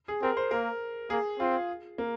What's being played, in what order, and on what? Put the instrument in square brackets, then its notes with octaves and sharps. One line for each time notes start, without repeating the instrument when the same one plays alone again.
[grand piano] G#4
[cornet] C4 [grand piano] A#4
[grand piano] C5
[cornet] A#3 [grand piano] A#4
[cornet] A#3 [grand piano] G#4
[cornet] C4 [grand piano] F4
[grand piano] A#3